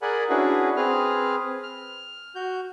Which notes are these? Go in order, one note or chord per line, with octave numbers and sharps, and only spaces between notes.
G#4 A#4 D5 F#5 G#5 B5
C#4 D4 E4 F#4 G#4 B4
C4 G#4 B4 F6
F6
F#4 G6